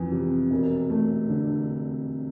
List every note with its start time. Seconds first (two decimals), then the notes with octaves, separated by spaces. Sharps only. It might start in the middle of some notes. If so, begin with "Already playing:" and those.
Already playing: F2 E3
0.12 C3
0.51 E1
0.90 A3
1.29 D3